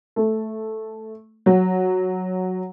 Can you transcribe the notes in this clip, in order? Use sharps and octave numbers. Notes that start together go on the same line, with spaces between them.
A3
F#3